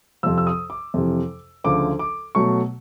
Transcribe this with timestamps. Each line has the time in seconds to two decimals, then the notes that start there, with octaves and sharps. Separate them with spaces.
0.23 F2 C3 F3 E6
0.38 E6
0.47 D#6
0.70 D6
0.94 F2 C3 E3
1.64 D2 C#3 F3 D6
1.99 D6
2.35 B2 F#3 A3 C#6